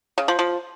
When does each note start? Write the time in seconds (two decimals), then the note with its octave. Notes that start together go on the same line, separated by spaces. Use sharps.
0.18 C#3
0.28 F3
0.39 F3